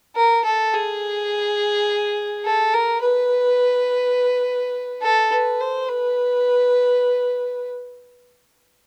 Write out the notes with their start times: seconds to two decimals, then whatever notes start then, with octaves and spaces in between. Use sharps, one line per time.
0.16 A#4
0.45 A4
0.74 G#4
2.45 A4
2.74 A#4
3.02 B4
5.02 A4
5.31 B4
5.60 C5
5.88 B4